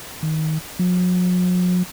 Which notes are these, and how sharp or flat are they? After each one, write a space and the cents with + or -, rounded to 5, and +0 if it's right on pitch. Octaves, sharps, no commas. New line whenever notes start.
D#3 +15
F#3 -45